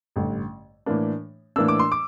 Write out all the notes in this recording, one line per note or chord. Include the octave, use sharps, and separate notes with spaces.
A1 G2 D3
A2 E3 A#3 D4
A2 E3 A#3 D4 E6
D6
C6
D6